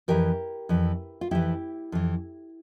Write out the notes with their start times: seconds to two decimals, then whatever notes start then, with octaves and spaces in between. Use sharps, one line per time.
0.08 F2 E3 G4 A#4
0.69 F2 E3
1.21 F4
1.31 F2 E3 E4 G4
1.92 F2 E3